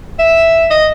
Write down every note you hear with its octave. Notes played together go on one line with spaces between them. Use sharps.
E5
D#5